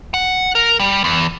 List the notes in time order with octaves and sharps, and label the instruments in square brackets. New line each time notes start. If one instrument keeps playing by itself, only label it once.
[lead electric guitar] F#5
A#4
G3
E2